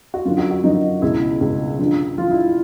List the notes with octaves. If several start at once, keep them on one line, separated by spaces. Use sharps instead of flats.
F#4
F#2 D3 F3 F4
F#4
F#4
F#2 D3 F3 D#4
C#2 B2 E4
C#2 B2
G2 D3 F3
G2 D3 F3 F4
E4